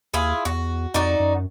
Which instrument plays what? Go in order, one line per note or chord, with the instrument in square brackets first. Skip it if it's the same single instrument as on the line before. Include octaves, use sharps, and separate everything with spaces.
[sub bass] D#2 [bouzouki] E4 F4 G#4
[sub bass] E2 [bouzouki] F#4
[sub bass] F2 [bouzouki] D#4 F#4 D5
[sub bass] F#2